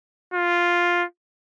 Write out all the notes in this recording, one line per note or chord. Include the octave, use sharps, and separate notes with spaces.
F4